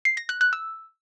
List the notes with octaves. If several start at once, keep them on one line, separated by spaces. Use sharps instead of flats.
C7
A#6
F#6
F#6
E6